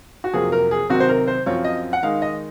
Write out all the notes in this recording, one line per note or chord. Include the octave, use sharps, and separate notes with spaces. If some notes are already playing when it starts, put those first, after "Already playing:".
F#4
F2 C3 F#3 A#3 F4 G#4
A#4
G#4
C3 D#3 F#3 C4 D#4 F#4
C5
A#4
C5
F#2 F3 C4 F4 C#5
D#5
F#5
D#3 G#3 D#4 F5
D#5